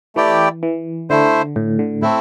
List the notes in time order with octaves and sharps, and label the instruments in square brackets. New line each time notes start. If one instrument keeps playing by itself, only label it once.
[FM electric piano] E3 [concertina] A3 E4 G4 D5 G5
[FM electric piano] E3
[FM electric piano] D3 [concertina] A3 E4 C5
[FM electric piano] A2
D3
[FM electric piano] A2 [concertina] A3 C4 E4